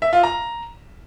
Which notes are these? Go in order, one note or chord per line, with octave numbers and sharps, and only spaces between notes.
E5
F4
A#5